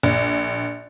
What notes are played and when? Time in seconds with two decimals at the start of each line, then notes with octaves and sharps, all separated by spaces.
0.03 A#1